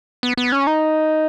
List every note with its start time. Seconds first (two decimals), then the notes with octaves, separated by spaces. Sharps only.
0.23 B3
0.37 B3
0.52 C#4
0.67 D#4